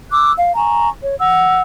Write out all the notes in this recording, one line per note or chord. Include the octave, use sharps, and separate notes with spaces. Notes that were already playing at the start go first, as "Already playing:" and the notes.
D6 E6 F#6
F5
G#5 A#5 C#6
C#5
F#5 E6